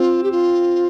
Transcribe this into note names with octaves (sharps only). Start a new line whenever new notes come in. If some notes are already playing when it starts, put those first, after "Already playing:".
Already playing: C4 F4
G4
F4